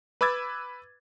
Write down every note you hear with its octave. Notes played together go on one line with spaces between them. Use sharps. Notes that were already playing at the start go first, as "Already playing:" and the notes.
B4 B5 D6 E6 G#6 A6